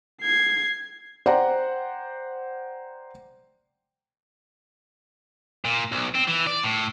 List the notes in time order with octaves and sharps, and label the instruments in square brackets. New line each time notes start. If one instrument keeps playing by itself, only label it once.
[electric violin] G#6 C7
[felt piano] C5 D5 F#5 G5 A#5
[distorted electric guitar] A#2
B1
C4
E3
D5
A2